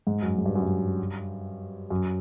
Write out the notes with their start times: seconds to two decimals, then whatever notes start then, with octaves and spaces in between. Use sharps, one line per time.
0.07 G#2
0.22 F#2
0.38 G#2
0.46 G2
0.55 F#2
0.63 G2
1.90 F#2